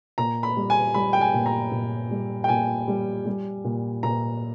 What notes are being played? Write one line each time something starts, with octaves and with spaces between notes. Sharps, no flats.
A#2 A#5
B5
G3
G#5
G3 B5
G5
G#5
A#2
A#5
A#2
G3
G5
A#2 G#5
G3
G3
A#2
A#2 A#5